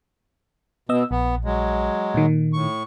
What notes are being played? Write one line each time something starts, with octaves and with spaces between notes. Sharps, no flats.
B2 B3 D#5 E6
A#1 B3
F#3 G#3
A#2 D#3
A2 C#6